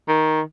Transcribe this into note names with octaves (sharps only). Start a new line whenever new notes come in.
D#3